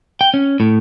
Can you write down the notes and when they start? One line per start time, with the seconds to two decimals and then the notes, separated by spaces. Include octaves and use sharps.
0.21 G5
0.34 C#4
0.60 A2